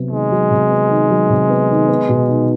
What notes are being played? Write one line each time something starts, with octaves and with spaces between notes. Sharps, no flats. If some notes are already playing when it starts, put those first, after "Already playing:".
Already playing: C3 F#3 B3
D#3 G#3
F#3
C3
B3
D#3
F#3
C3
B3
D#3
B3
B2
D#4